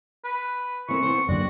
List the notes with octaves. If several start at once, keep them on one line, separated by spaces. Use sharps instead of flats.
B4
E3 C4 A#4 C#6
B3 C4 C5
F#2 D3 A#3 F#4 G4 D5